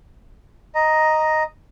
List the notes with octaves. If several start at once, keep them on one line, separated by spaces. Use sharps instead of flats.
D#5 A#5